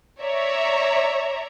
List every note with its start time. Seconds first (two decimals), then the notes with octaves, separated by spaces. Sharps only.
0.22 C#5 D5 E5 A#5